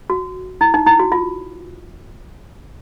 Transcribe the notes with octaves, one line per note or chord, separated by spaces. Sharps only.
F#4
E4
D#4
E4
F#4
F4